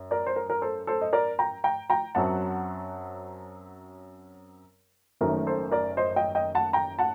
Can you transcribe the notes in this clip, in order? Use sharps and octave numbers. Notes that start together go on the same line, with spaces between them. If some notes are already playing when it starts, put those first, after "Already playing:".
Already playing: F#2
A#4 D5
C5
A#4
A#4
A4 C5
A4 C5
D#5
A#4 D5
G5 A#5
G5 A#5
G5 A#5
F#2 F#3 C4 F#5 A5
F#1 F#2 D#3 A3 A#4
A4 C5
A#4 D5
C5 D#5
D#5 G5
D#5 G5
F#5 A5
G5 A#5
F#5 A5